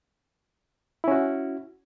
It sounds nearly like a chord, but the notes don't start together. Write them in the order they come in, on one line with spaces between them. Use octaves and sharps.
E4 C#4 F#4